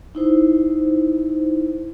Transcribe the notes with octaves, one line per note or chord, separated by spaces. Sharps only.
D#4 E4 C5